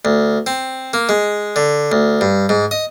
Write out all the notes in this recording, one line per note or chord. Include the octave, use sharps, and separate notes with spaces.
D2
C4
A#3
G#3
D3
D2
G2
G#2
D#5